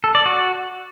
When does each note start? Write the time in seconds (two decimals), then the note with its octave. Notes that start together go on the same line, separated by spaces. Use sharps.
0.04 A4
0.15 D5
0.26 F#4